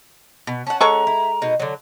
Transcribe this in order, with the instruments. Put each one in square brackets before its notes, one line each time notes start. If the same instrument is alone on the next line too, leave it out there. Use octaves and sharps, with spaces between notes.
[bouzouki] B2
[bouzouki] C#4 F#5 [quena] A5
[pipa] G#3 A4 C#6 [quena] A#5
[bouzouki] E4
B2 D#4
D3 F#3